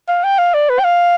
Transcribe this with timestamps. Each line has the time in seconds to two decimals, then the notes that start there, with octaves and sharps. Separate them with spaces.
0.08 F5
0.24 G5
0.38 F5
0.54 D5
0.69 B4
0.79 G5
0.84 F5